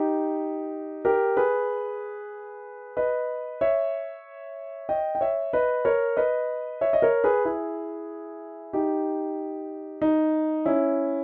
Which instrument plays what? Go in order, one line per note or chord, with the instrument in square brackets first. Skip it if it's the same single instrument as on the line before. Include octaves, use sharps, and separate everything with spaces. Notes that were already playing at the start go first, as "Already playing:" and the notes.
Already playing: [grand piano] D#4 G4
G4 A#4
G#4 B4
B4 D#5
C#5 E5
D#5 G5
G5
C#5 E5
B4 D#5
A#4 C#5
B4 D#5
C#5 E5
D#5
A#4 C#5
G#4 B4
E4 G#4
D#4 G4
D#4
C#4 E4